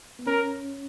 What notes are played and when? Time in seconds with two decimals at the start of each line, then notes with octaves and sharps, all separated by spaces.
0.19 B3
0.27 C#4 A#4